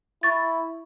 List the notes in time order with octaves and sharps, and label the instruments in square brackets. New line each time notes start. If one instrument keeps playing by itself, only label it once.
[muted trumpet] E4 [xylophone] C#6 A6